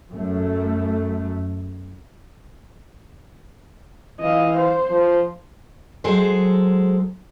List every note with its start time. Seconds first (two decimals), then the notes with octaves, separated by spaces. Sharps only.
0.11 F#2 A3
4.20 E3 D#5 F5
4.57 C5
4.90 F3
6.04 F#3 G#3 G#4 A4 C5